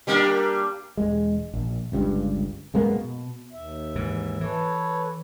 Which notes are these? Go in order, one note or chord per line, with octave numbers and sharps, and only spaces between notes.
G3 A#3 D4
E1 G#3
A#1
G1 C#2 G2
F#2 G#3 A#3 B3
B2
D#2 E5
G#2 E3
E3 A4 B4 C#5